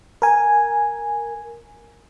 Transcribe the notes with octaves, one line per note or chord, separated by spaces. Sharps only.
A#4 G#5